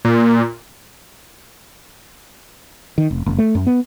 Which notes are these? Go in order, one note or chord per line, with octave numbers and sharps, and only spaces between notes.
A#2
D#3
F1
F#1
A3
F#2
B3